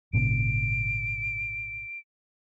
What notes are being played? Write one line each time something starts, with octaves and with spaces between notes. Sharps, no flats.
G#1 A#2 C#3 D7